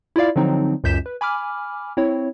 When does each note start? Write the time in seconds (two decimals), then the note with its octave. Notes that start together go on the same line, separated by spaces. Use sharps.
0.16 E4 F4 D5 F5
0.36 D3 F3 F#3 C4 D#4
0.84 C#2 F#2 G6 B6 E7
1.06 B4
1.21 G#5 B5 D6 F6
1.97 C4 E4 C#5